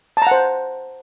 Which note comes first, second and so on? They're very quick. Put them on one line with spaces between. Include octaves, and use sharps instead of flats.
A5 A#5 F#5 C5